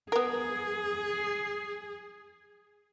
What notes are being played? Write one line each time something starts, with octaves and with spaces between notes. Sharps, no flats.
B3 G#4 A#4